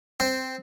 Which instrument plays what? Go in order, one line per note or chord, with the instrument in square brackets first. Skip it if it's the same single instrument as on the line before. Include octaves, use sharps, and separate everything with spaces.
[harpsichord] C4